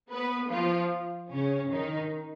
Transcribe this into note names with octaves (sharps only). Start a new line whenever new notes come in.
B3 B4
F3 F4
C#3 C#4
D#3 D#4